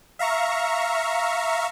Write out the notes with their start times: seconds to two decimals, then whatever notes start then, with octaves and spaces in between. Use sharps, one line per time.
0.19 E5 F5 A#5 C#6